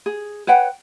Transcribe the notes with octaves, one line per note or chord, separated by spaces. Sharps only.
G#4
B4 C#5 F#5 G5